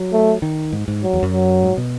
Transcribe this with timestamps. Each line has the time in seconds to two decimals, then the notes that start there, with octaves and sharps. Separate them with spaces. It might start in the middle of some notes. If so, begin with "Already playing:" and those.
Already playing: F#3
0.13 A3
0.42 D#3
0.73 G#2
0.88 G#2
1.03 F#3
1.13 E2
1.23 F#2
1.33 F#3
1.62 G#2
1.77 B2